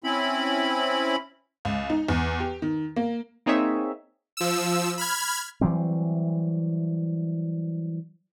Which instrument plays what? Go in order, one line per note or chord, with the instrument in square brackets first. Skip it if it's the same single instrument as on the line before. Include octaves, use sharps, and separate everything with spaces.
[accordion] C4 C#4 E4 B5
[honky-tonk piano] C#2
D#4
E2
G4
D#3
A#3
[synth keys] A#3 C4 D#4 G#4 C#5 E5
[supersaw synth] F3 E6
B5 F6 G#6
[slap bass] E3 F#3 G3 C4